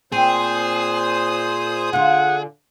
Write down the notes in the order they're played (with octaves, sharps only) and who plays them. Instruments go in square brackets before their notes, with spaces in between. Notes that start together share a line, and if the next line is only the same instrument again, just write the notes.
[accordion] A#2 C5 D#6 [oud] C4 [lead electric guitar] G#4
[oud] D3 F4 [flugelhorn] F#5